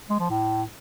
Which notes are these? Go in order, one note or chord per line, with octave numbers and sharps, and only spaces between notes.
G#3
F3
A2